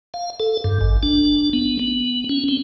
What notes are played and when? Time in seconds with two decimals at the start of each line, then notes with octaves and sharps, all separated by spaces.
0.14 F5
0.40 A4
0.64 G2
0.81 G#1
1.03 D4
1.53 B3
1.79 B3
2.29 C#4
2.48 C4